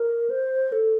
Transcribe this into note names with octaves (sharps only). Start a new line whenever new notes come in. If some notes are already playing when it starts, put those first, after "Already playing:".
Already playing: A#4
C5
A4